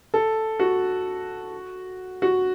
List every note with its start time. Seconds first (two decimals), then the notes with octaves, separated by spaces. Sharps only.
0.14 A4
0.60 F#4
2.22 F#4